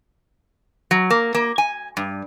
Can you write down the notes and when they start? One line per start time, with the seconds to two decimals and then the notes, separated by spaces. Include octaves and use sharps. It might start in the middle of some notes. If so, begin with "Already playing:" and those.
0.91 F#3
1.10 A#3
1.35 A#3
1.58 G#5
1.97 G2